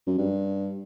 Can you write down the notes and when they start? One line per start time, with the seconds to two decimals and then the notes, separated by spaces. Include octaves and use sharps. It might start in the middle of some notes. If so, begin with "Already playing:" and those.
0.07 F#2
0.18 G2